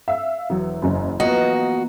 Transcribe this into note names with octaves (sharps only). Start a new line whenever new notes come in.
E5 F5 E6
E1 F#3
F#1 F#2
A#3 B3 F4 F#4 D#5